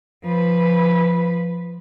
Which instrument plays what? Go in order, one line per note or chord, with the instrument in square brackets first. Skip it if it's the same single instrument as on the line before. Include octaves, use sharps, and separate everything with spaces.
[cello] F3 B4